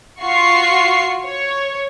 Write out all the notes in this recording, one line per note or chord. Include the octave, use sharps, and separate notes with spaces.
F4 F#4 C#6 C7
C#5